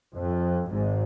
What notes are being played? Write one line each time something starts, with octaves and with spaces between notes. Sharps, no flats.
F2
G#1 G#2